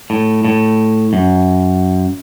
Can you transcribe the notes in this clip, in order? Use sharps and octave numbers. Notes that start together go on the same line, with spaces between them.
A2
A2
F#2